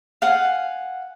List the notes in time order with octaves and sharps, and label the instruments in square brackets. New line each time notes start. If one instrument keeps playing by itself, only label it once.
[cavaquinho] F5 F#5 G#5